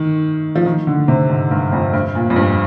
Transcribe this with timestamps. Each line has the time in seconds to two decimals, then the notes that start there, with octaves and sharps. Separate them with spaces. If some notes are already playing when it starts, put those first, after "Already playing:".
Already playing: D#3
0.55 F3
0.66 D#3
0.87 D3
1.08 C3
1.29 G#2
1.51 G2
1.72 F2
1.93 G2
2.15 A#2
2.30 F2
2.36 G2